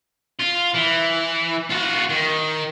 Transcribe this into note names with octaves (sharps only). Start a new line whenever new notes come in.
F4
E3
F4 F#4
D#3